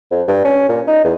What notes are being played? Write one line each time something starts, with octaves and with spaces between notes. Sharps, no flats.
F2
G2
C#4
A#2
D#4
E2